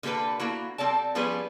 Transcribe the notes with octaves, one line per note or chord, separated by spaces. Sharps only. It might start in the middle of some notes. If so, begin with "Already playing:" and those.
D3 A#3 G4 A4 B4
A#3 B3 E4 F#4
G3 C4 A4 D5 A5
F3 G3 B3 C#4 G#4 B4